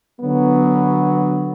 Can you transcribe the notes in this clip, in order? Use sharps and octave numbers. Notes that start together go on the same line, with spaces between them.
D3 F#3 B3